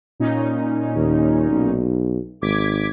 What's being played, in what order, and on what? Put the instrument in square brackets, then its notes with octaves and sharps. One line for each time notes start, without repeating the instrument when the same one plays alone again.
[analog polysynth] A#2 C#4 D#4
[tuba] D#2
B1
[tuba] G#1 [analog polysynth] D6 G#6 B6